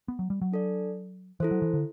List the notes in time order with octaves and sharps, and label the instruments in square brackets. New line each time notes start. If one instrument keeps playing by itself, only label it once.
[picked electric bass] B3
F#3
G3
F#3
[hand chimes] D4 A4 D5
[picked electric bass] E3 [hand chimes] E4 A4 C5
[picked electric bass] F#3
E3
D3